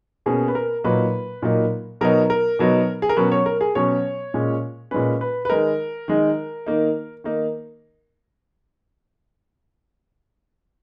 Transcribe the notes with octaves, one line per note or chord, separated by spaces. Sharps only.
B2 A#3 C#4 G#4
B4
A#4
A#2 F#3 A#3 D#4 B4
A#2 F#3 A#3 D#4
B2 F#3 B3 D#4 A#4
A#4
B2 F#3 B3 D#4
G#4
A#4
B2 F#3 C#4 B4
C#5
A#4
G#4
B2 F#3 C#4 C#5
A#2 G#3 C#4
A#2 G#3 C#4 B4
B4
B4
D#3 G#3 D#4 A#4
D#3 G#3 D#4
D#3 A#3 D#4
D#3 A#3 D#4